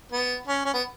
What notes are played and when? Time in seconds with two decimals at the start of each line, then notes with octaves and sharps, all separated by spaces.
0.12 B3
0.47 C#4
0.65 C#4
0.74 B3